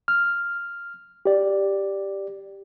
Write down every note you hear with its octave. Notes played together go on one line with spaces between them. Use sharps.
F6
G4 D5